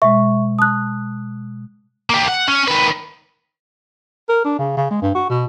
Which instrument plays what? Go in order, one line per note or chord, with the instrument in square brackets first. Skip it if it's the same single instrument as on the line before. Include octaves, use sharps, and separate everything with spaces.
[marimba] B2 G#3 [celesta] E5 C#6
[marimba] A5 [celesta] D#6 F#6
[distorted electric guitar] A#3 G4
F#5
C#4
D#3 B4
[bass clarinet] A#4
D4
C#3
C#3
G#3
G2
F#4
B2